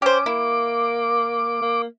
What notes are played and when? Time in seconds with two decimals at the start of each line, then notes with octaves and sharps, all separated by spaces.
0.02 C#4 G4 C5 D6
0.26 A#3 E4
1.61 A#3